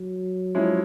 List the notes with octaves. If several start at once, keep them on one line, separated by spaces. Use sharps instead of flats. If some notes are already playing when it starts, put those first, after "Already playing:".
Already playing: F#3
F3 G#3 C#4 E4